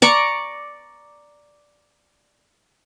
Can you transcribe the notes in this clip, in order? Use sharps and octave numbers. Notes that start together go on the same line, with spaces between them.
D5 A#5 C#6